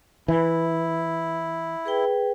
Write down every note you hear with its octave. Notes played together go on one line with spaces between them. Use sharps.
E3 E4
G#4 B4 G5